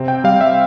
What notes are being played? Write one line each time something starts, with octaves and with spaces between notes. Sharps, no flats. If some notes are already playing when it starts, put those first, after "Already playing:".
Already playing: C3 C4
G5
G3 F5
E5